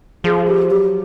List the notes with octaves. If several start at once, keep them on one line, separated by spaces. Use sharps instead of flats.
F3 G#4
G4
F#3 G4